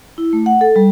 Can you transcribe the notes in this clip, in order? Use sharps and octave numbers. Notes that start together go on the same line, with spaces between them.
E4
A3
F#5
A4
G3